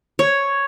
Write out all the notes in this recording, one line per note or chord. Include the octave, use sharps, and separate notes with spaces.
C#5